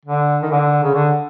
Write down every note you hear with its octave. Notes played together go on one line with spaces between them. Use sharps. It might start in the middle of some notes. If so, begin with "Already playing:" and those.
D3
D#3
D3
C#3
D3